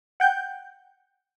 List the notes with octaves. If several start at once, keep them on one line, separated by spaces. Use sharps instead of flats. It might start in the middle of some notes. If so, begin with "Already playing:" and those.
F#5 G5 G6